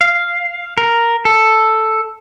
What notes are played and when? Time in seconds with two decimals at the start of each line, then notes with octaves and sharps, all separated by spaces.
0.01 F5
0.78 A#4
1.25 A4